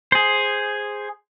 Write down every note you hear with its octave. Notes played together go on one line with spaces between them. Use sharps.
G#4 C5